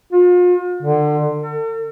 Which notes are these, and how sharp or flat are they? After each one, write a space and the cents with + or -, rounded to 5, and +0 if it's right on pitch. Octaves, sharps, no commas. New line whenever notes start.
F4 +40
D3 +25
A4 +45